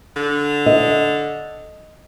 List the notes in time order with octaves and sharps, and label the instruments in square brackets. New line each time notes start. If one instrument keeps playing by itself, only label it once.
[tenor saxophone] D3
[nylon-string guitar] D#5